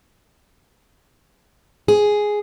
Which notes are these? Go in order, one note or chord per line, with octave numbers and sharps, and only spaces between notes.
G#4